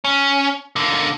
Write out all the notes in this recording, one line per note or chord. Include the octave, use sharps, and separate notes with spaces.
C#4
D3 A#3